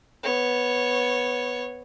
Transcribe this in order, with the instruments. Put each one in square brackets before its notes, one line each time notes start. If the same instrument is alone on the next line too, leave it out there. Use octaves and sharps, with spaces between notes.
[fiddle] B3 C#5